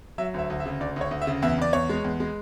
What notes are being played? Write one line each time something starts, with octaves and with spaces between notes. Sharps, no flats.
F#3 E5
D2 E5
D2
E5
C#3
D2 D5
D2 C#5
D2
E5
C#3
E2 E5
E2 D5
E2 C#5
G#3
E2
G#3